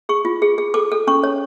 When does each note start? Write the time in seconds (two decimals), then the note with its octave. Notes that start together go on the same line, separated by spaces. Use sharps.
0.09 G#4 C#6
0.25 F4
0.42 G#4
0.58 G#4
0.74 A4 D6
0.92 A4
1.07 C#4 C#6
1.23 C#5